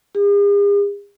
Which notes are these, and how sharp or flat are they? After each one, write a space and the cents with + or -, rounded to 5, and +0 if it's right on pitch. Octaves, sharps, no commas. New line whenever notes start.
G#4 -45